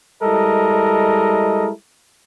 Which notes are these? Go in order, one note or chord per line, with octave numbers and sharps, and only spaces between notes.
G3 G#3 E4 A4 A#4 D#5